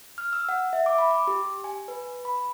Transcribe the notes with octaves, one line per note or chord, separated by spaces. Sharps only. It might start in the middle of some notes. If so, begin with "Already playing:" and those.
F6
E6
F#5
E5
D6
B5
D6
G4
G#5
B4
B5